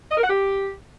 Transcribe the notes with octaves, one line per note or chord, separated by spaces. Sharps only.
D#5
A#4
F#5
G4